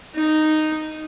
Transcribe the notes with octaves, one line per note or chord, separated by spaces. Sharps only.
D#4